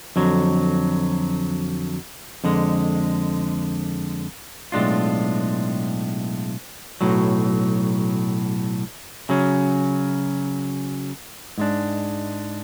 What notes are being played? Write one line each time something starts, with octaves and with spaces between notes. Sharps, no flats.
F2 D3 F#3
F2 D3 G#3
B1 A2 G#3 D4 F4
B1 A2 F#3
C#3 F#3 C#4
G#2 G#3 D4